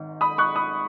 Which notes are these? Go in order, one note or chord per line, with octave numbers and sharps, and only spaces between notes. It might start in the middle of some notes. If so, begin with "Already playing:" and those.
Already playing: G#1 G#2 D#3
B5 D#6
C#6 F#6
B5 D#6